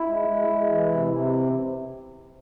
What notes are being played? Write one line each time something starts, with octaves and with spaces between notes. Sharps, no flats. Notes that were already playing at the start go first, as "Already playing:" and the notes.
Already playing: E4
G#3
G#3
G#3
E3
C3
C3